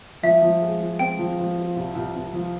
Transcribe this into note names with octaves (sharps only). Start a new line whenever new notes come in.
F3 E5
F3
G#3
F3
C4 G5
F3
F3
F4
C2
C2
C2
F3